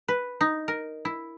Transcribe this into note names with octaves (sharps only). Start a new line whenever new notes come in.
B4
D#4
A#4
E4